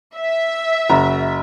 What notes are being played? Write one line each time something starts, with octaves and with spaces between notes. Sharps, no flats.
E5
F#1 F#4 A#5